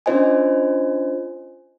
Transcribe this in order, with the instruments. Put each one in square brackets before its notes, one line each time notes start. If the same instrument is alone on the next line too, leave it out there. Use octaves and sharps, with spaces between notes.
[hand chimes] C#4 D4 F4 C5 D#5 G#5